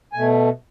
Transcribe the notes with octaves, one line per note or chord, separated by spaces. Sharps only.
B2 A3 G#5